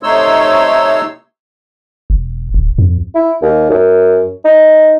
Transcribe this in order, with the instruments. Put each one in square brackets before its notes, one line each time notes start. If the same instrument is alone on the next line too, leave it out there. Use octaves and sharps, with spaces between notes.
[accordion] C3 A3 D#4 C#5 C6 E6
[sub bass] E1
D1
F2
[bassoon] E4
D#2
F#2
D#4